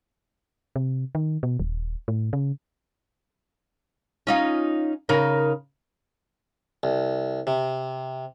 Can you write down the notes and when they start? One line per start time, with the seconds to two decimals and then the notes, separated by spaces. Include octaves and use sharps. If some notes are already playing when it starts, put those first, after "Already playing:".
0.76 C3
1.15 D#3
1.43 B2
1.60 D#1
2.08 A2
2.33 C#3
4.27 C#4 D#4 F4
5.09 C#3 D#4 A#4
6.83 C2
7.47 C3